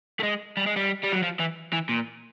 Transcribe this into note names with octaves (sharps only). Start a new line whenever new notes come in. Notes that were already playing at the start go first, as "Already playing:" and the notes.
A3
G#3
G3
G#3
G3
G3
F#3
F3
E3
E3
A#2